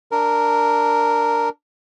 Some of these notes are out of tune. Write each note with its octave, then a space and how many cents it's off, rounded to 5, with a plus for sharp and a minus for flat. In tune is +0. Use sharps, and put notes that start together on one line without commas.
D4 +0 A#4 -5